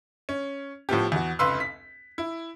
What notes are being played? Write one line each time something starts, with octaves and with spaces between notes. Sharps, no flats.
C#4
A2 F3 B3 G4
E2 F#4
F1 C#2 B4 C6 E6
B6
E4